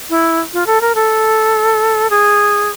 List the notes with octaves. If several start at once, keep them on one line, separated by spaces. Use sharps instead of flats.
E4
F4
A4
A#4
A4
G#4